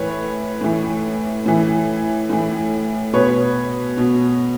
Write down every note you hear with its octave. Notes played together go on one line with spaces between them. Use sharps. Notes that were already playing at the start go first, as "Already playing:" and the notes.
Already playing: A2 E3 B4 C#5
A2 E3
A2 E3
A2 E3
B2 B4 C#5
B2